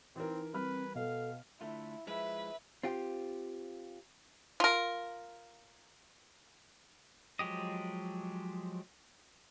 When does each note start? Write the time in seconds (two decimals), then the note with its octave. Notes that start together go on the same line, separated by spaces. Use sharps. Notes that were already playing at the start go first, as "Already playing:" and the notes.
0.16 E3 C4 D#4 A#4
0.54 G3 C4 B4 B5 F6
0.95 B2 A4 F5
1.61 D3 A3 E4 F4
2.07 F3 G#3 E4 B4 E5
2.83 C4 F4 G4
4.60 F4 A#4
7.39 F3 F#3 G#3 G4 D#5